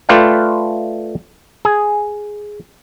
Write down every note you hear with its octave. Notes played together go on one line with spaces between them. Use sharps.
A3 F4 B4 D5 F5 G5
G#4